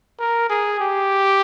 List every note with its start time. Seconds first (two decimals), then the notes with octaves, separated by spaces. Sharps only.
0.19 A#4
0.49 G#4
0.80 G4